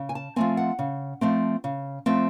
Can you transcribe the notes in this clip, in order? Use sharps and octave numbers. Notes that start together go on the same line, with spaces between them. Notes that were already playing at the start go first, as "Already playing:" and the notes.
Already playing: C#3
G#5
A5
F3 A3 C4 G#5
F#5
C#3
F3 A3 C4
C#3
F3 A3 C4